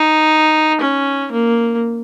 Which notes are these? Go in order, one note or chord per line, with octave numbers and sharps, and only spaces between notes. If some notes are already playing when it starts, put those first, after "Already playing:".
Already playing: D#4
C#4
A#3